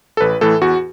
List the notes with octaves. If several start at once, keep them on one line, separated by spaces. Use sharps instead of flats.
A4
A1 B4
A2 E3 A4
E2 F#4